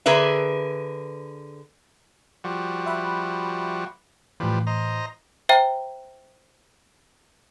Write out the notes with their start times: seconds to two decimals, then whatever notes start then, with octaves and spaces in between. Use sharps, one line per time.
0.06 D3 G#4 A#4 B4 E5
2.44 F3 G3 F#4
2.86 E5 B5 F#6
4.40 A2 E3 F3 G3 B4
4.67 C5 D#5 A#5
5.49 C5 E5 G5 A#5